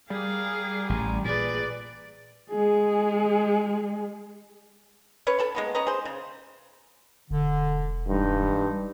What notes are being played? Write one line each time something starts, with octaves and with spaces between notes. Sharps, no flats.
G3 G#4 A#4 F5
A1 G#5 A#5
A#2 G#4 B4 D5
G#3 G#4
C#4 B4 C#5
A4 A5 B5
G#3 A#3 B3
C#4 B4 D#5 A#5
G#4 C5
C#3
E1 D3
G2 E3 G#3 D#4